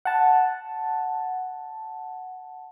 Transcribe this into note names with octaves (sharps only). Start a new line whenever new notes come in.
F#5 A5